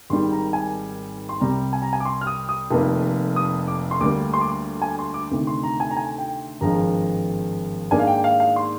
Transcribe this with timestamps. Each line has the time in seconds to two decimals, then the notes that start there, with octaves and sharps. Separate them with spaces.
0.10 G#1 G#2 D#3 G3 C6
0.32 A#5
0.53 G#5
1.29 C6
1.41 C2 C3 G3 A#5
1.73 G#5
1.82 A#5
1.93 G#5
2.00 D6
2.05 C6
2.21 F6
2.27 D#6
2.49 D#6
2.71 F1 F2 D#3 A#3
3.36 D#6
3.68 D6
3.91 C6
4.00 D2 D3 G3 A#3 D6
4.34 C6
4.41 D6
4.48 C6
4.82 G#5
4.99 C6
5.14 D6
5.31 D2 C3 D#3
5.47 C6
5.63 A#5
5.80 G#5
5.91 A#5
5.97 G#5
6.18 G5
6.61 G#1 G2 F3 G#3 A#5
7.91 G#2 D#3 A#3 D4 G#5
7.99 F5
8.07 G5
8.24 F5
8.40 F5
8.56 C6